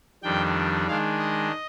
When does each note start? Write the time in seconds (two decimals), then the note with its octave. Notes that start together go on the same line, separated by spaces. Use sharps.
0.23 F2 D#3 G3 D4 G5
0.88 D#3 G#3 D4 F5
1.19 D#5